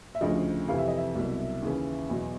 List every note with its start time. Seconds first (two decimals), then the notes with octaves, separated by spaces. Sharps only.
0.15 E5
0.21 D2 C#3 F3 D#5
0.68 F2 C3 E3 F5
0.78 E5
0.88 D#5
0.97 E5
1.15 C2 B2 F#3
1.62 D#2 C#3 E3
2.10 E2 B2 F#3